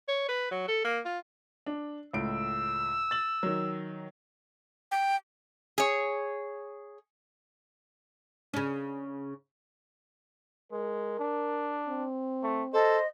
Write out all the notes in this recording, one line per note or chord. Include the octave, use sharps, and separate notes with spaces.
C#5
B4
F#3
A4
A#3
F4
D4
C#2 A2 E6 D7
A6 F#7
D#3 F#3
G5
G#4 C#5
C#3 C#4
G#3 A#4
D4
C4
A3
A4 C5 D#5